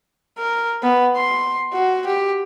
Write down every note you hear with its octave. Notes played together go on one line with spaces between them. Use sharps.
A#4
B3
C6
F#4
G4